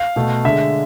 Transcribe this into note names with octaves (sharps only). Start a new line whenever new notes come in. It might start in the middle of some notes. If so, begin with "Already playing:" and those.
Already playing: F5
B2 A3
D3 G#3 E5